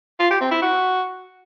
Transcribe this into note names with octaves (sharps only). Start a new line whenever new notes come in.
F4
G4
C4
E4
F#4